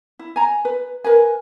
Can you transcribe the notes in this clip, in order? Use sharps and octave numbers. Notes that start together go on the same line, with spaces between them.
E4
G#5 A#5
B4
A#4 B4 G#5